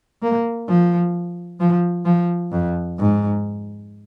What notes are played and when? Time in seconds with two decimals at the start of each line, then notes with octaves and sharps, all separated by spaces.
0.22 A#3
0.68 F3
1.60 F3
2.06 F3
2.52 F2
2.99 G#2